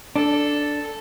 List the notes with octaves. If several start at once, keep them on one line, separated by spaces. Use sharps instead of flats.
D4 A4